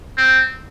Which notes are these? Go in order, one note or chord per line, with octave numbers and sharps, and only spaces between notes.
C4